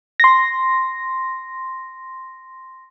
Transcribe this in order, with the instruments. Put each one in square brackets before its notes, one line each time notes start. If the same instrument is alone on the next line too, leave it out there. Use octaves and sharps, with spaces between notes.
[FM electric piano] C6 A#6